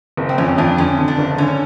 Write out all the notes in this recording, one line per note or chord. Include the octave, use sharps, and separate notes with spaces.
F#1
C4
F2 C#4
F2 D4
D3 C#4
D3
D4
F#1
D3 C#4